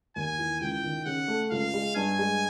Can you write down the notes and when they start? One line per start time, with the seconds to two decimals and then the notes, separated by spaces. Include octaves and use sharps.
0.16 D#2 G#5
0.39 E3
0.61 C#2 G5
0.84 D#3
1.06 C#3 F#5
1.28 A3
1.51 C#2 F5
1.74 G#3
1.96 G2 G#5
2.19 G#3